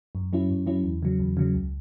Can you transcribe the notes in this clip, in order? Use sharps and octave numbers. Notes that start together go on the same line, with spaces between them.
F#2
F#3 C#4 E4
F#2
F#3 C#4 E4
E2
C#3 F#3
E2
C#3 F#3
C#2